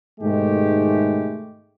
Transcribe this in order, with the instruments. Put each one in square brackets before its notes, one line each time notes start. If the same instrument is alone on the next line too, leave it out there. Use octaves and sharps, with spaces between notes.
[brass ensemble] G#2 B2 D#3 G#3 A3 G4